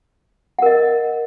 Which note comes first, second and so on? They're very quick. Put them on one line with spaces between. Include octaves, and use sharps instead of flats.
F#5 A#4 D#5